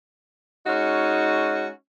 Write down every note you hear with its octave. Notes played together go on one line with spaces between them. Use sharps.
G#3 C#4 D#4 F#4